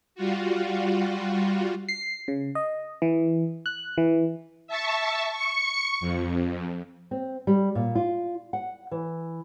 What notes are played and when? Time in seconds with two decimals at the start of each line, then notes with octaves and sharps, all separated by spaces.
0.15 G3 F4 F#4
1.89 C7
2.28 C#3
2.55 D#5
3.02 E3
3.66 F#6
3.98 E3
4.67 E5 A5 C#6
5.31 C#6 C#7
6.01 F2
7.11 C4
7.47 G3
7.75 A#2
7.95 F4
8.53 F#5
8.91 E3